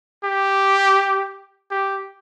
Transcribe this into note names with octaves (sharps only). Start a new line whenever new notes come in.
G4
G4